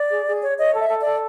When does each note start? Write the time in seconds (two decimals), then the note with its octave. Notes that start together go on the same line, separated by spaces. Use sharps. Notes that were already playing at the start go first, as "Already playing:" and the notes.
Already playing: D5
0.09 G#4
0.26 G#4
0.41 C#5
0.56 C#5 D#5
0.73 A4
0.78 E5
0.89 A4
1.00 D5
1.05 A4